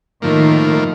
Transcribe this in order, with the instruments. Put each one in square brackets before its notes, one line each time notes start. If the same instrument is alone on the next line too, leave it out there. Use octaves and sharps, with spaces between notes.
[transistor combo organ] A2 F3 A#3 [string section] D#3